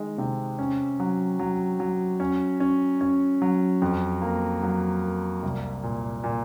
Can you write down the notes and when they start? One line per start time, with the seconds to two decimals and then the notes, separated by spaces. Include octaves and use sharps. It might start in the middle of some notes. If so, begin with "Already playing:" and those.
Already playing: D#3 G#3
0.18 C3
0.59 C#4
1.00 F#3
1.39 F#3
1.80 F#3
2.20 C#4
2.60 C#4
3.01 C#4
3.42 F#3
3.82 F2
4.22 A#3
4.63 F#3
5.03 A#3
5.43 C2
5.83 A#2
6.24 A#2